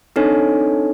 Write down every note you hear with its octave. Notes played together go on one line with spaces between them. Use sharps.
C4 D4 D#4 A4 C#5 G#5